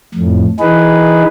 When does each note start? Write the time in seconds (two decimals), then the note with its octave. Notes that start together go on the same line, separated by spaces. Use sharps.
0.14 F2 A2
0.60 E3 D#4 G#4 B4